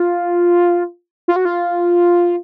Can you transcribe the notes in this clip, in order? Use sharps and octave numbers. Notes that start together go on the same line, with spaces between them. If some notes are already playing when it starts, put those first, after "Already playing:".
Already playing: F4
F4
F#4
F4